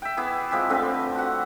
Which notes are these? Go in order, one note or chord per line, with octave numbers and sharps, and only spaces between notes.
E5 G5
B3 E4 G#4 D6
F3 G#3 C4 G4
D3 A3 C4 B4
F#4 F#5